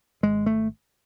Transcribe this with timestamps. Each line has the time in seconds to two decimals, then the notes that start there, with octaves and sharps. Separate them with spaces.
0.23 G#1 G#3
0.46 A3